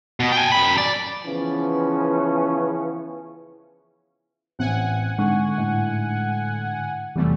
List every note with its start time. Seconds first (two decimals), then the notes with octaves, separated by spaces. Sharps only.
0.20 B2
0.32 G5 G#5
0.52 F#2 B5
0.78 D5
1.25 C#3 E3 F3 B3 C#4
4.59 A1 C4 F#5 G#5
5.18 G#2 D3 C#6
5.58 A2
7.16 E2 C3 F#3 G3 A3